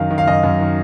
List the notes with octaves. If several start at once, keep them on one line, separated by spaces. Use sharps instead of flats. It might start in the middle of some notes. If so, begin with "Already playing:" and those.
Already playing: F#2 D#3 F5
D#3
F5
F#2 D#5
F#2
D#3